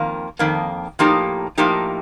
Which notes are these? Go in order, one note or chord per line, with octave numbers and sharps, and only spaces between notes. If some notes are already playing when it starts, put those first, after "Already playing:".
Already playing: F2 D#3 A#3
F2 D#3 A#3
A2 F3 A#3 D#4 G4
A2 F3 A#3 D#4 G4